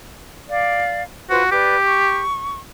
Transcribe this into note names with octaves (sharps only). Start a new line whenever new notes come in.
D5 F5
F4 F#4 B4 C5
G4 B4 D5
C#6